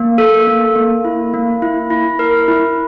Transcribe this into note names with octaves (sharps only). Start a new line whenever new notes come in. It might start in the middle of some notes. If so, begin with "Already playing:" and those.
Already playing: A#3
A4
A#3
A#3
E4
A#3
E4
E4
A#4
E4